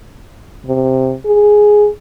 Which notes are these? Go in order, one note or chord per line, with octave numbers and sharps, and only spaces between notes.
C3
G#4